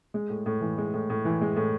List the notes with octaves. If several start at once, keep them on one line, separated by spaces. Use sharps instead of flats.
G#3
A2
A2
E3
G#3
A2
A2
E3
G#3
A2